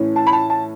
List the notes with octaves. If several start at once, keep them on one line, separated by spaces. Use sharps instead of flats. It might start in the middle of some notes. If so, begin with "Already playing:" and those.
Already playing: A2 E3 A3 C#4 E4
A5
B5
A5
A5